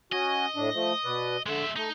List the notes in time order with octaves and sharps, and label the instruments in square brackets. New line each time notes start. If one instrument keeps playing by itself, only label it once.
[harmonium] C#4 F#4 G#5 [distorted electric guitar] D#5
[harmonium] A2 D4
F3 A3
B2 B4 D5
[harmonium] D3 [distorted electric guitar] G#3 E5
[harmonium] A3 [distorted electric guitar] D#4